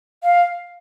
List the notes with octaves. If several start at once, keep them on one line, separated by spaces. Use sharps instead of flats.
F5